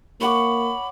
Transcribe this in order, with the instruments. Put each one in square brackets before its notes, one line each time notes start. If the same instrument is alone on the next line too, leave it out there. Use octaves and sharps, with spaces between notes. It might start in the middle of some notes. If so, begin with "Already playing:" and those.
[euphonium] A#3 [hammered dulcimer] C#5 F#5 D6 [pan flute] B5